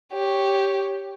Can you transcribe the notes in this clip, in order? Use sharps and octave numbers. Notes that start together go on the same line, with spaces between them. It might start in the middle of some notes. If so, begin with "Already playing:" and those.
G4 C#5